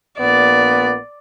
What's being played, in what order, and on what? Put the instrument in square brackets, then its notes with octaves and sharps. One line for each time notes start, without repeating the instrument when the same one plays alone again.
[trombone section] A#1 A#2 B3 [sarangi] D5